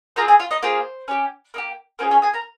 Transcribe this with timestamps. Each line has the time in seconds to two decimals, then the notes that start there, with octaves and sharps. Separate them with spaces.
0.16 C4 F4 G#4 A#4 A#5
0.28 G#4 G#5
0.39 F4 F5
0.51 D#4 D#5
0.62 A#3 F4 G#4 C5
1.08 C#4 G4
1.54 A#3 D#4 G4
1.99 A#3 C#4 F4 G#4 C5
2.11 C#4 C#5
2.22 G#4 G#5
2.33 A#4 A#5